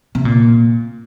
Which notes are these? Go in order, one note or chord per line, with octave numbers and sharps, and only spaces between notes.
C3
A#2